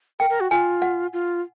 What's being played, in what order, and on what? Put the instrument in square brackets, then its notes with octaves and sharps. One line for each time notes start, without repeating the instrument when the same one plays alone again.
[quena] A#4 [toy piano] G5
[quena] A#4
F#4
[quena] F4 [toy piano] G#5
[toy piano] F#5
[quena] F4